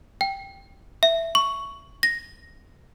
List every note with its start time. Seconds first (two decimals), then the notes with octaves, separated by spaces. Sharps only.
0.21 G5
1.03 E5
1.35 C#6
2.03 A#6